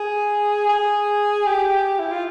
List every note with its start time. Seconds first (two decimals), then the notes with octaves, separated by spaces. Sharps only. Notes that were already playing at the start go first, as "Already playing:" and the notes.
Already playing: G#4
0.69 G#4
1.47 G4
1.99 E4
2.11 F4